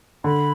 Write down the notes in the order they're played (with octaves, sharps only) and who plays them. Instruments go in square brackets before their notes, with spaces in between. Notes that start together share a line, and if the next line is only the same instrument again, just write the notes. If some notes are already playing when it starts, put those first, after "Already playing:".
[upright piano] D3 [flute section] B5